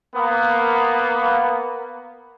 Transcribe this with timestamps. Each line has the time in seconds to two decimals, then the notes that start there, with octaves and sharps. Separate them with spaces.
0.15 A#3 B3